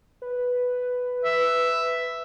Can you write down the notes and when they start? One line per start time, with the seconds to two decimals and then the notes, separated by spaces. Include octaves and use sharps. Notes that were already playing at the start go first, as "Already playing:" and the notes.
0.22 B4
1.25 E5